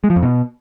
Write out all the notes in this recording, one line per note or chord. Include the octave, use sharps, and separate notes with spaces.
G#3
F3
F2
B2